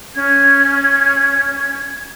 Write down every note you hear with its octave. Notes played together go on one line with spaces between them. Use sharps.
C#4 G#6